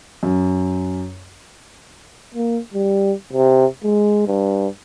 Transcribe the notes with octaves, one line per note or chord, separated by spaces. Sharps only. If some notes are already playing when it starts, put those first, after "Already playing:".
F#2
A#3
G3
C3
G#3
G2